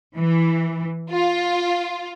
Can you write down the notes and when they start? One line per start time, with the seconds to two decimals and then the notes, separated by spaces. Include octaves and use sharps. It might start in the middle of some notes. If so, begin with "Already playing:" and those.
0.17 E3
1.10 F4